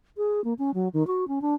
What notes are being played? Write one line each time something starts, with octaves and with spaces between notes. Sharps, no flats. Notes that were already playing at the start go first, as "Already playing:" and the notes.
G#4
A#3
C#4
F#3
D#3
F#4
C#4
D4